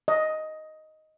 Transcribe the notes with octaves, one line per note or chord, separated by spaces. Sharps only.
D#5